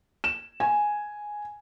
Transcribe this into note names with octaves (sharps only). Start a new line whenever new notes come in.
E7
G#5